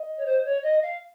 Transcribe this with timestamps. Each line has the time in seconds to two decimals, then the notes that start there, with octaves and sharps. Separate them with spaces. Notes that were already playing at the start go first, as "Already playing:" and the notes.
Already playing: D#5
0.17 C#5
0.26 C5
0.45 C#5
0.63 D#5
0.82 F5